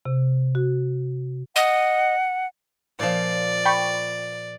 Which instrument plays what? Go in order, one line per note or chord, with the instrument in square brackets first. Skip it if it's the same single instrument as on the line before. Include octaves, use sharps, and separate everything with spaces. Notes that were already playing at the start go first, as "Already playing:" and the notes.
[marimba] C3
F#4
[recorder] D#5 [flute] F#5
[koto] A#2 F3 [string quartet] D5
[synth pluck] G5 B5 C#6